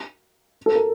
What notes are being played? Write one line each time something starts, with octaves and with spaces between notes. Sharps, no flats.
A4
A#4